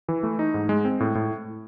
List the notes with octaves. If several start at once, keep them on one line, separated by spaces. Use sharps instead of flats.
E3
A3
D#4
G#2
G#3
C4
A2
A2